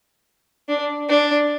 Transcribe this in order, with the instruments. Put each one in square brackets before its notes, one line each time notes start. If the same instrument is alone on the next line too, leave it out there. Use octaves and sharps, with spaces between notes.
[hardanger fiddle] D4
D4